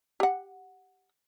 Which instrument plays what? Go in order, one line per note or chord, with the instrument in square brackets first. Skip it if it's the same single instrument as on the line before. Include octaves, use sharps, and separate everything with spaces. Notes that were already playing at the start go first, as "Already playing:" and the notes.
[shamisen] G4 F#5